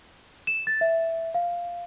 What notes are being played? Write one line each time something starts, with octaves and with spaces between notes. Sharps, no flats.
E7
A6
E5
F5